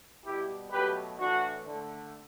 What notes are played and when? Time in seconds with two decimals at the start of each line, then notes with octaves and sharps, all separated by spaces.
0.24 B2 G3 E4 G4
0.71 B2 F#3 A3 G4 B4
1.18 A2 E3 A3 D4 F#4
1.65 D3 A3